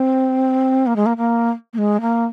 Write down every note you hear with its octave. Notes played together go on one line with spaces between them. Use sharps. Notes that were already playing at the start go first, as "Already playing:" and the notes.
Already playing: C4
A#3
G#3
A#3
A#3
A#3
G#3
A#3